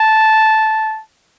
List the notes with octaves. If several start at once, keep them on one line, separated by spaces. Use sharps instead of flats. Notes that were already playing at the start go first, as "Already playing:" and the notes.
Already playing: A5